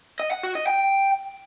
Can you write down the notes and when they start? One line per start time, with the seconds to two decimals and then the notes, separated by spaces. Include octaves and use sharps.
0.20 D#5
0.31 F#5
0.43 F#4
0.55 D#5
0.67 G5